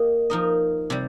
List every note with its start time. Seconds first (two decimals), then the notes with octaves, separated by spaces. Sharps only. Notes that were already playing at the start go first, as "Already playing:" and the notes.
Already playing: A#3 G4 D#5
0.30 F3 D#4 A#4 D#5
0.90 C3 G3